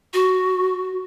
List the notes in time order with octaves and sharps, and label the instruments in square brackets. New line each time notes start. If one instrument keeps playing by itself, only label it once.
[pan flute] F#4